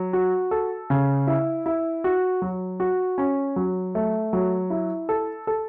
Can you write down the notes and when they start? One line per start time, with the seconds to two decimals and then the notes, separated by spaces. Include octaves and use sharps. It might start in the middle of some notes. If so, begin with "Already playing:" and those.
Already playing: F#3
0.13 F#4
0.51 A4
0.90 C#3
1.27 E4
1.66 E4
2.04 F#4
2.42 F#3
2.80 F#4
3.18 C#4
3.56 F#3
3.95 A3
4.33 F#3
4.70 E4
5.09 A4
5.47 A4